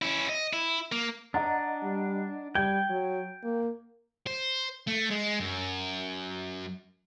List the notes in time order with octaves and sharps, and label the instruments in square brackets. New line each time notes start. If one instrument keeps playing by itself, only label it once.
[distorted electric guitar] C#4 E4
D#5
E4
A#3
[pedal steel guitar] D4 [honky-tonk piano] D#5 F#5 A#5
[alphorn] G3
[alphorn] G3 [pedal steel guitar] G5 [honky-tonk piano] G#6
[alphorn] F#3
A#3
[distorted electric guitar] C5
A3
G#3
F#2